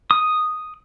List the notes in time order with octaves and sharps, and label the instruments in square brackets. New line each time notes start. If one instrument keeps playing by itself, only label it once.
[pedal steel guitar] D#6